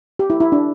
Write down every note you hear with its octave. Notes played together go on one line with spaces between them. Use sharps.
G4
E4
E4
D4